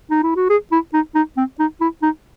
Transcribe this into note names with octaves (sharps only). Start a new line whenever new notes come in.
D#4
E4
F#4
G#4
E4
D#4
D#4
C4
D#4
E4
D#4